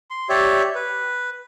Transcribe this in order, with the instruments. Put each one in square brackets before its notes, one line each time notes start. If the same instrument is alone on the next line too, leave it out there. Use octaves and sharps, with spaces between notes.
[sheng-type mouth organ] C6
G4 C#5 D5 E5
B4